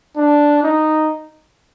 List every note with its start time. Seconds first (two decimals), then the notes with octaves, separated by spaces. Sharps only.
0.17 D4
0.63 D#4